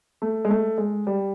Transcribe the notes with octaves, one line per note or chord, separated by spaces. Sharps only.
A3
G#3
A3
G#3
G3